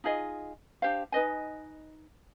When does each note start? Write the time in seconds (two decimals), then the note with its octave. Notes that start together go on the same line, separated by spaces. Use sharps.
0.04 D#4 F4 G#4 D#5
0.82 D4 G4 C5 F5
1.12 D#4 B4 D#5 G#5